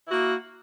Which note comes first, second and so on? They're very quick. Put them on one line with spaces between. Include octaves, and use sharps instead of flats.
E4 F#4 A#3